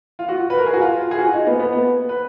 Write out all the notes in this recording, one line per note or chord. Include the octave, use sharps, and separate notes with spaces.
F4
F#4
B4
A#4
G#4
F#4
F4
G#4
F#4
F4
D#4
B3
B3
B3
B4